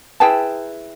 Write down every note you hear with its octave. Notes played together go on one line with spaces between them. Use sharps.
E4 G#4 B4 G5 A5